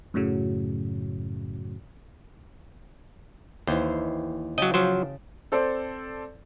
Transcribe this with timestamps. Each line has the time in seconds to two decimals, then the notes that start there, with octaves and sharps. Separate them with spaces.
0.14 F#2 A2 C#3 F#3
3.67 D#2 E3 C5
4.58 C#3 F#3 D#5 G5 A5
4.74 F3 F#3 C5
5.52 C4 A4 C5 D5